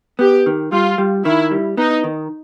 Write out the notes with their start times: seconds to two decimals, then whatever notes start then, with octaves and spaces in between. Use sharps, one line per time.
0.19 B3 G4
0.46 D#3
0.72 G3 F4
0.98 G3
1.25 D#3 E4
1.51 G3
1.77 B3 D#4
2.04 D#3